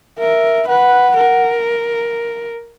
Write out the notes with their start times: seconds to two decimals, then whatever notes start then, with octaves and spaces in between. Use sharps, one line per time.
0.19 A#4 E5
0.68 B4 F#5
1.17 A#4